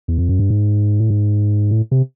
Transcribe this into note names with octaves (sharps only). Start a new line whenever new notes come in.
E2
F2
F#2
G2
G#2
A2
G#2
A2
C3